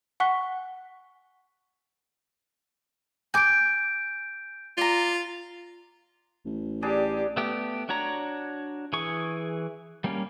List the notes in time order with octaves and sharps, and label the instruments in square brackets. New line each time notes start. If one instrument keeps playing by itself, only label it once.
[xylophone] F#5 G#5 C#6 F#6 B6 G7
[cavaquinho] G#5 D6 [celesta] G6 D7
[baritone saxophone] F4 [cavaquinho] D5 A#5
[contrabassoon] A1
[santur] G3 D4 G#4 [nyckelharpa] G4
[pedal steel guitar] A3 B3 G4
D4 F#4 C#5 A#5
E3 G#4 C#6
G3 A#3 C#4